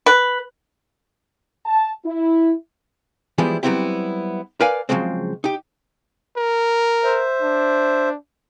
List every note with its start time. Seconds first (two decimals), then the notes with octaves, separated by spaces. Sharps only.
0.06 B4
1.66 A5
2.05 E4
3.38 E3 F3 G3 G#3 B3 E4
3.63 F#3 G3 B3 C4 E4 G4
4.61 A#4 B4 D5 F5 G#5
4.89 C#3 F3 F#3 G#3 C4
5.44 D#4 G4
6.37 A#4
7.04 C5 E5
7.42 D4